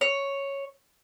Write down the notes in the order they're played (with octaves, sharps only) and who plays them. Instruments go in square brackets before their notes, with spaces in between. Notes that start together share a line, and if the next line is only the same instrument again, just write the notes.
[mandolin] C#5